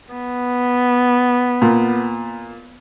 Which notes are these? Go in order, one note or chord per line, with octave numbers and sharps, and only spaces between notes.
B3
A#2